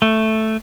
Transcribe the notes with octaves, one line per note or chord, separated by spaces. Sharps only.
A3